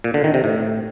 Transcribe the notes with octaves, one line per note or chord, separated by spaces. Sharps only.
A#2
D3
D#3
C3
A2